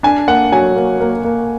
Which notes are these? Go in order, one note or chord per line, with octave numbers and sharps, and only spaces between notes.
D4 G#5
A#3 F#5
F#3 G#5
A#3
A#3
A#3